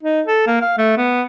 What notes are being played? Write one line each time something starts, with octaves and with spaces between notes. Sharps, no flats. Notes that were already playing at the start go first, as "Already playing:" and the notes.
D#4
A4
A#3
F5
A3
B3